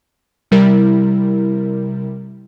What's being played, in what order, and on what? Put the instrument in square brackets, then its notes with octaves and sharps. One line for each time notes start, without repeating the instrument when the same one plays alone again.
[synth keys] C3 G3 E4 A#4